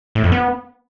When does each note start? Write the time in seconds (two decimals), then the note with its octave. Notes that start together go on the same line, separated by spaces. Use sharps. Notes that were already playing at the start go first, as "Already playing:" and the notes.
0.15 A2
0.24 F2
0.32 B3